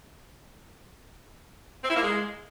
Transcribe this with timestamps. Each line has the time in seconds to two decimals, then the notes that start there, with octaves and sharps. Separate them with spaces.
1.83 C4
1.90 E4
1.96 A#3
2.03 G#3